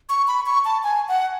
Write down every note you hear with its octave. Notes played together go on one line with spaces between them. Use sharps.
C#6
B5
C#6
A5
G#5
F#5